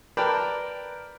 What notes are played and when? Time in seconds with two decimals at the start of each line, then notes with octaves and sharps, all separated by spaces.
0.17 A#4 B4 D5 G5 A5 B5